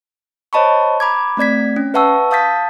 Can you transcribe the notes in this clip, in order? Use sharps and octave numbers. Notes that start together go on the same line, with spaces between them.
C5 C#5 D#5 A5 B5 C#6
A#5 B5 D6 G#6
A3 C4 D5 G#6 B6
C#4
B4 E5 F#5 A5 C#6 E6
F5 A5 D#6 G6 A6 B6